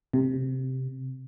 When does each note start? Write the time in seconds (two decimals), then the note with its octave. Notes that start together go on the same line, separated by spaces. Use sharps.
0.13 C3